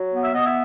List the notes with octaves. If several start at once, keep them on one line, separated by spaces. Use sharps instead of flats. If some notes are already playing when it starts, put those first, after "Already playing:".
Already playing: F#3
B3
E5
B3 D#5
E5